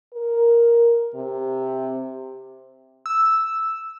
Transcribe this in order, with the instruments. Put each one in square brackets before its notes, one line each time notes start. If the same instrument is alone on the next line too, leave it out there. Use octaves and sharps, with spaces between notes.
[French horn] A#4
C3
[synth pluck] E6